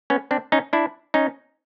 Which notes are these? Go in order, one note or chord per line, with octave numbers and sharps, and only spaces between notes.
B3 C#4
C4 D4
C#4 D#4
D4 E4
C#4 D#4